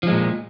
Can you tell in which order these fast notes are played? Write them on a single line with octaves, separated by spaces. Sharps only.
F3 G#3 A#2